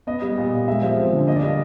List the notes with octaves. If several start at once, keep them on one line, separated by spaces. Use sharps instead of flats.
B3 D#5
G3
A#2
A#2
G#3 E5
F3
C4
D3
A#3 D#5
D5
G3 D#5